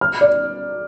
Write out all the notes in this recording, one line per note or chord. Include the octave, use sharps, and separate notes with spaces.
F6
D5